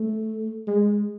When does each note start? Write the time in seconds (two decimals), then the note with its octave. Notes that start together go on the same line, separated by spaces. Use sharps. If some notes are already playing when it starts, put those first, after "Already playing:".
Already playing: A3
0.67 G#3